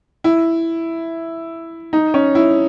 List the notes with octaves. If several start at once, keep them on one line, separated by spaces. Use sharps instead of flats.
E4
D#4
C#4
E4